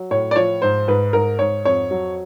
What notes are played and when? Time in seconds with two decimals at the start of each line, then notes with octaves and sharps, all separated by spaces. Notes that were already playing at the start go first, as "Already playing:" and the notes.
Already playing: F#3
0.11 A2 C#5
0.31 D5
0.36 F3 C#5
0.62 G#2 C5
0.88 G#2 B4
1.13 G#2 A#4
1.39 G#2 C#5
1.65 F2 C#5
1.91 F#3